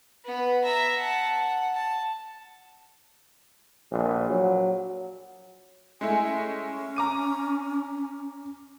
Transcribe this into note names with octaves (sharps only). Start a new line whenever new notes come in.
B3 B4
E5 A#5
F#5 A5
F#5
A5
A#1
F#3
G#3 A3 E4 G#5
C#4
A#5 D6 D#7